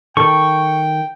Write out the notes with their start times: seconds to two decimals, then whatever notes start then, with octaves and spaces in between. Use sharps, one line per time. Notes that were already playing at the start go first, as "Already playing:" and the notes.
0.17 D#3 A4 G5 C#6